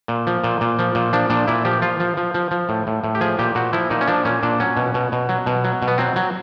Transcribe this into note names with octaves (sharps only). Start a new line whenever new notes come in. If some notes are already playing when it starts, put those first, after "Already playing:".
A#2
F3
A#2
A#2
F3
A#2
F3 D4
A#2 D4
A#2 E4
F3 G4
F3 F4
F3
F3
F3
F3
A2
A2
A2
G4
F3 G#4
A#2 G4
A#2 F#4
F3 E4
A#2 D#4
C#4
F3 D4
A#2 C#4
A#2 D4
F#3 C#4
B2
B2
B2
F#3
B2
F#3
B2
B3
F#3 C4
F#3